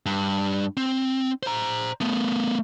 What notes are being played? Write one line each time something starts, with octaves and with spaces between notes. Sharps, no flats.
G2
C4
C5 A#5
A3 B3